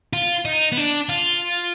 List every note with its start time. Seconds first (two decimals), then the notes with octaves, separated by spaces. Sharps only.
0.13 F4
0.45 D#4
0.72 B3
0.77 D4
1.09 F4